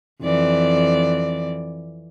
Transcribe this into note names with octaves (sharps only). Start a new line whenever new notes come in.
F2 E3 D5